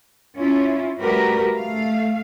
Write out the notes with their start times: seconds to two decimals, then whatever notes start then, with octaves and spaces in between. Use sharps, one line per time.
0.36 C#4 E4 F4
0.99 G3 A3 F#4 G4 A#4 B4
1.55 A3 F5